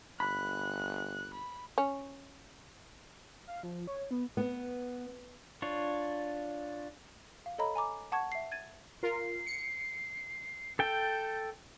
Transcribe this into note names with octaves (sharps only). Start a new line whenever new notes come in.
G1 B5 F#6
B5
C#4
F5
F3
C#5
B3
B3
D4 F4 C#5
F5
A4 C#5 D#5 A#5 B5
G#5 A#5 D6
F#5 A5 C#6 G#6
E5 C7
G#6 A6 D#7
F4 A#4 C7
C#7
A4 G5 G6